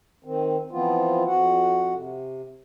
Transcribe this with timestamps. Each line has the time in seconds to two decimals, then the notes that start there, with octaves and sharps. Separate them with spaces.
0.24 D#3 C4
0.71 E3 F3 B3 C4 F4
1.27 F2 F#4 F#5
1.94 C3